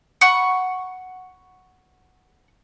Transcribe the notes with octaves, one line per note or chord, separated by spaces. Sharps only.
F#5 B5 C#6